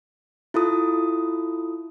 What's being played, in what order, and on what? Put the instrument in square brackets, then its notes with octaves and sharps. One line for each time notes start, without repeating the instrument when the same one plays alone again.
[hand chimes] E4 F4 A4 D#6